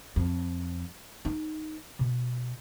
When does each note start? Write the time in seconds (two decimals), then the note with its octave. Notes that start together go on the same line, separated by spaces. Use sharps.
0.16 F2
1.25 D#4
1.99 B2